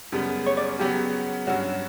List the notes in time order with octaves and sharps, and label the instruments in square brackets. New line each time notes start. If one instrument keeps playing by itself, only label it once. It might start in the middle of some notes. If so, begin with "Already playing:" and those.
[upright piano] F#2 C#3 G3 B3
[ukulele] C#5
D5
[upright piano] C#3 F#3 B3 F#4 [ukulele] G4
[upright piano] G2 F#3 C#4 [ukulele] F#4